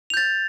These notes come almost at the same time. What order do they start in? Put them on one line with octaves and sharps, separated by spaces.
F7 G6 A6